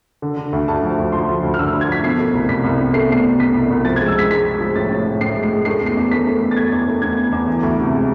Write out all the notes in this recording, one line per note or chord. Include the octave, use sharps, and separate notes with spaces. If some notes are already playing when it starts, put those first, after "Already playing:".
D3
D3
D2
D2 A5
F3
D2
F3 C6
D2
D2
F6
D3 E6
D2
G#6
F3 B6
B2 C7
A3
C2
C2 B6
C2
B2
A3 C7
B2 C7
B2
B2 B6
C2
C2
F3 A6
G#6
G#3
E6
G#3 B6
G#3 B6
G#3
F3
A2 A6
A2
A2
A2 C7
G#3
C7
G#3
A3 C7
E2
C7
E2
A3 B6
A3
E2
A6
A3 G#6
E2
A3
E2 G#6
E2
E2
E3
D2
C3
G#3